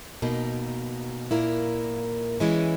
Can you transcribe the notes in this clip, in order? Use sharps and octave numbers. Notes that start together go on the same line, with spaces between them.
B2 A#3 D#4
A#2 A#3 E4 A#4
E3 G#3 C#4 E4